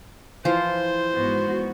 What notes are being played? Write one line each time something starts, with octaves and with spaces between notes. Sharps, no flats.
E3 F3 F4 C5
G#2 B3 F#4